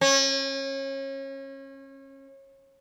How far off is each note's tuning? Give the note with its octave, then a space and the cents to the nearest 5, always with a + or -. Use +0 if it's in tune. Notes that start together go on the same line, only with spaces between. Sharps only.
C#4 -30